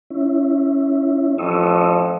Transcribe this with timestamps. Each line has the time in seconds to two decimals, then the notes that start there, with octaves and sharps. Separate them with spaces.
0.10 C#4 E4
1.38 A1 F2 F3 C#6 D#6 E6